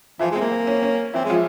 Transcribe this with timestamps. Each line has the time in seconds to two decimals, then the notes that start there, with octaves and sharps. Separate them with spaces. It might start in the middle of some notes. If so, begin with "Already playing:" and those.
0.19 E3 F3 E4
0.31 G#3
0.36 C4
0.41 A#3
0.52 C4
0.67 C#4
0.83 C#4
1.14 E3 C4 E4
1.25 G#3
1.30 F3 F4